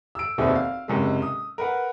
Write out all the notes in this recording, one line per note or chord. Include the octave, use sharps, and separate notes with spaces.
E6 D7
F1 D#2 B2 C4 G#4 E5
F5
F#1 C3 G#3
D#6
A#4 B4 F#5